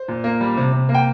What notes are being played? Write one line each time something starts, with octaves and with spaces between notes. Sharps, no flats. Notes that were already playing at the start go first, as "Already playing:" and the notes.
Already playing: C5
A#2
A#3
G3
C3
C3
A#3
G5